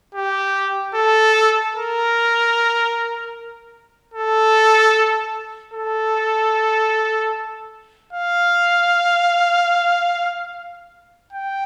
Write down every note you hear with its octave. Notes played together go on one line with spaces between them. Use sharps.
G4
A4
A#4
A4
A4
F5
G5